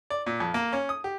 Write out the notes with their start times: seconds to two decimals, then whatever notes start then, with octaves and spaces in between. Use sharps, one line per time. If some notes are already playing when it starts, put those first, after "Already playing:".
0.10 D5
0.26 A#2
0.40 F2
0.54 A#3
0.73 C#4
0.89 D#6
1.04 G4